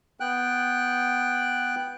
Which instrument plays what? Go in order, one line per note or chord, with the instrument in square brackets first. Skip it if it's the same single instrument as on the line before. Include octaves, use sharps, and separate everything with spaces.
[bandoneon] B3 G5 F#6